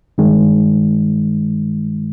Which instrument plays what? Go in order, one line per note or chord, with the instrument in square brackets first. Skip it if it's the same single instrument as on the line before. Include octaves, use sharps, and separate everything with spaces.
[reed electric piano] G2 D#3 G#3